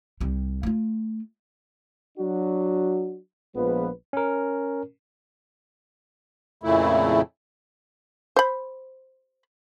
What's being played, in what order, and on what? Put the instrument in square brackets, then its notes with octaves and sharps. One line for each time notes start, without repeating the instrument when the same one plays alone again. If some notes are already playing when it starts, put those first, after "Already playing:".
[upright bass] C2 G3
A3 F4
[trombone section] F#3 D4 F#4
A#1 F3 G#3 B3 B4
[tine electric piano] C#4 A#4
[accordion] F2 A#2 C#3 A3 E4
[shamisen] C5 B5